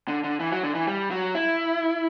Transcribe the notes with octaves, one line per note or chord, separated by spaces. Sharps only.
D3
D3
E3
F#3
D3
E3
G3
F#3
E4